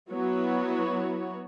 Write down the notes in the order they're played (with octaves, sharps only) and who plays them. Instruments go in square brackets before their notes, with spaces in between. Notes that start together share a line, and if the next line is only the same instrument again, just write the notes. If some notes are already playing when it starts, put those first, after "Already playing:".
[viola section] F#3 B3 E4 F#4 C#5